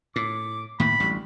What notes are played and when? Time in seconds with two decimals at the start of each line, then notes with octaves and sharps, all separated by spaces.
0.16 A2 D6
0.80 A2 D#3 A#3 B5
1.00 A1 D2 G3